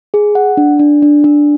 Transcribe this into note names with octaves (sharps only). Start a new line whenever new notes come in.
G#4
F#5
D4
D4
D4
D4